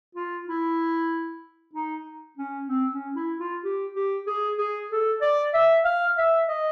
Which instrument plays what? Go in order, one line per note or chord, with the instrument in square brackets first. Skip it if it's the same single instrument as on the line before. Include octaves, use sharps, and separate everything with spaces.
[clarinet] F4
E4
D#4
C#4
C4
C#4
E4
F4
G4
G4
G#4
G#4
A4
D5
E5
F5
E5
D#5